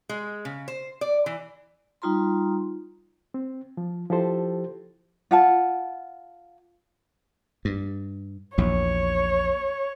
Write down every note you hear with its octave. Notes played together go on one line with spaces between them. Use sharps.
G#3
C#3
C5
D5
E3
G3 D#4 F4 A#5 C6
C4
F3
F3 E4 G4 A4 C5
F4 F#5 A5
G2
A#1 E2 C#5